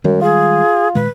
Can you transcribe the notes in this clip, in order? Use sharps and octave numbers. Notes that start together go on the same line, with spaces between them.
F#2 D#3 G3 G#3
F4 G#4
A#2 D#3 G#3 B4